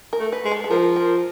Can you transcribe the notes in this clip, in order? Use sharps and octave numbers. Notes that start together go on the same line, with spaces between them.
A#4
A3
B4
G#3
A4
A4
F3 A#4
A#4